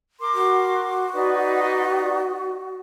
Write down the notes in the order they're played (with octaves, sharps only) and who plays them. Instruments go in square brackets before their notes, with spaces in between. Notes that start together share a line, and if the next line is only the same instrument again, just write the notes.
[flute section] A#4 C6 D6
[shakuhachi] F#4
[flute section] D#4 B4 D5